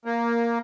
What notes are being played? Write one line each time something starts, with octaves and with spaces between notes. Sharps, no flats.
A#3